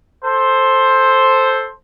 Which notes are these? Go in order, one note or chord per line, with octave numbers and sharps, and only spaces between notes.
A4 C5